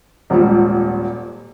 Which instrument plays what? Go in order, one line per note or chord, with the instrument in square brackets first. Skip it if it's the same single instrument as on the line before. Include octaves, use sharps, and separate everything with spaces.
[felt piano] D#1 G#1 F3 G3